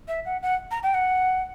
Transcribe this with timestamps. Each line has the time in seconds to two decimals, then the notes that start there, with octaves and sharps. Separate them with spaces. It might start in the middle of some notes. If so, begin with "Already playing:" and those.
0.08 E5
0.25 F#5
0.42 F#5
0.71 A#5
0.83 G5
0.94 F#5